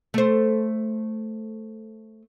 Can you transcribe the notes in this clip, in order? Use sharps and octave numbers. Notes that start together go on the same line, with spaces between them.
A3 C5